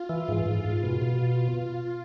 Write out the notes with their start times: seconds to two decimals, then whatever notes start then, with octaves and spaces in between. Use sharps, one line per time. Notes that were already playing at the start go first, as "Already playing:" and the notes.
Already playing: F4
0.09 E3
0.28 G#2 F4
0.46 G#2
0.64 G#2
0.83 B2
1.02 B2